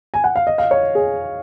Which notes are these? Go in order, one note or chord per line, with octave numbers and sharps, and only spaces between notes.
G#5
F#5
F5
D#5
F5
C#5
G#4